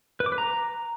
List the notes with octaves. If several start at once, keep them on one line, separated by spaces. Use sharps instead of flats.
B4
D6
B4
A#5